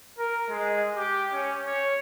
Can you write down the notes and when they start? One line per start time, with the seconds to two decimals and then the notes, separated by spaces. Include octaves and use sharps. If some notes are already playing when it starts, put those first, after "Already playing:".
0.18 A#4
0.50 G#3
0.96 G4
1.33 C#4
1.65 C#5